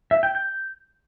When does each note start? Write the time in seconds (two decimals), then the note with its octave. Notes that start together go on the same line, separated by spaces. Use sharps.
0.11 E5
0.23 G5
0.35 G6